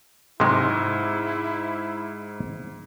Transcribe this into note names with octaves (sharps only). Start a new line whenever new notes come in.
G#2 C3 F#3 G#3 E4